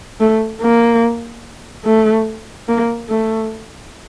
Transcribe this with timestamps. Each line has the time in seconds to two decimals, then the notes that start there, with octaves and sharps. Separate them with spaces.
0.20 A3
0.61 A#3
1.85 A3
2.69 A#3
3.09 A3